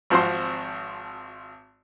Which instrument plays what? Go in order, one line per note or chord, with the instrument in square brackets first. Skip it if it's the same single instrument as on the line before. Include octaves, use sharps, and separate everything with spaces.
[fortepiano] G#1 F3 C4 F#4 C6